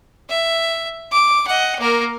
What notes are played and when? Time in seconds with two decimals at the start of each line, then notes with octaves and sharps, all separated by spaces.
0.29 E5
1.12 D6
1.47 D#5 F#5
1.80 A#3 A#4